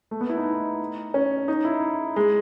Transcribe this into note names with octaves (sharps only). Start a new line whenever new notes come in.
A3
B3
E4
D#4
C#4
D#4
E4
G#3